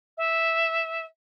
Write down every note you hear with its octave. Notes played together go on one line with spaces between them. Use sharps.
E5